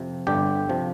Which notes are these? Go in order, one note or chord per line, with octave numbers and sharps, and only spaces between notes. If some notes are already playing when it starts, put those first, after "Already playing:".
Already playing: F2 C3 F3
G1 G2 D3 G4
C3 F3